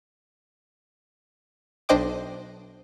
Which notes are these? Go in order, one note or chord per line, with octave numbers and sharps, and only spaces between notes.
B1 D4 C5 D#5 G5 D6